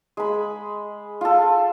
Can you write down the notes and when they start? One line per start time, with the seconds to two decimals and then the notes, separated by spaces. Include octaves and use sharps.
0.17 G#3 B5
1.21 F4 A4